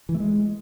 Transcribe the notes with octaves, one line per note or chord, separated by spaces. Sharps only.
E3
A3
G#3